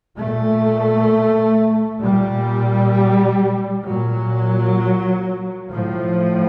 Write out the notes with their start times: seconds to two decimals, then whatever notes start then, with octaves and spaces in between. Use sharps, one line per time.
0.18 A#2 A3
2.02 A#2 G3
3.86 A#2 F#3
5.70 A2 F3